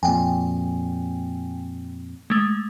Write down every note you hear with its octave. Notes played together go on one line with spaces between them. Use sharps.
F2 A#2 G5 G#5
G#3 A3